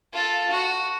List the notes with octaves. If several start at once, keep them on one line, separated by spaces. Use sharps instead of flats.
F4 A4
F#4